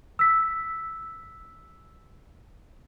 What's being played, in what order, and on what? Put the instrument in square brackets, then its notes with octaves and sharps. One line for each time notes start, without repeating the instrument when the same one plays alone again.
[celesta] E6 B6